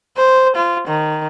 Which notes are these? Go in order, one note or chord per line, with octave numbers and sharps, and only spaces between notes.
C5
F4
D#3